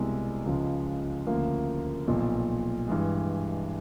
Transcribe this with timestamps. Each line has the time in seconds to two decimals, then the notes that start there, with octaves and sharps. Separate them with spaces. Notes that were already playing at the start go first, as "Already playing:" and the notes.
Already playing: C2 B2 G#3 C4 E4
0.46 C#2 C#3 F3 G#3
1.27 D2 C#3 F3 A#3
2.07 B1 A#2 F3
2.88 G2 E3 G#3